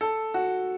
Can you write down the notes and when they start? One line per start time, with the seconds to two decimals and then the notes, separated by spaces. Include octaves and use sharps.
0.01 A4
0.34 F#4